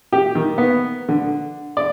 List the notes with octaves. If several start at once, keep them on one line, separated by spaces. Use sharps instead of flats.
G4
D#3
B3
D3
D5